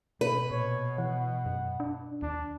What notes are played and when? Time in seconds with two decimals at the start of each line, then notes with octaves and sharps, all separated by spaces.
0.21 B2 B4
0.51 A#2 C#5
0.98 E3 F#5
1.46 F#2
1.80 D4
2.22 D#2 D4